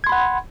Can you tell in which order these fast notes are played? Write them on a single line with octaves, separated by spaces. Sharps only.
G#6 C6 B5 F#5